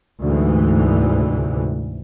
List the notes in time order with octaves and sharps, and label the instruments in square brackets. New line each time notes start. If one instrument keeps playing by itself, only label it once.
[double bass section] D2 G#2 C3 E3